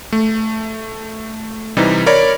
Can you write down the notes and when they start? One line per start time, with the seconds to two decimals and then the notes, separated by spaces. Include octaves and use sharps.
0.12 A3
1.77 C3 E3 G3 D#4
2.06 A#4 C#5 D5 B5